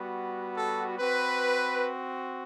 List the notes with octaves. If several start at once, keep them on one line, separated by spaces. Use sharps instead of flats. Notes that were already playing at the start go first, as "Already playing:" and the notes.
Already playing: G3 B3 F#4
A4
C4 F#4 B4